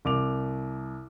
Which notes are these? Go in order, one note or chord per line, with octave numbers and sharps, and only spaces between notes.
C2 D6 F7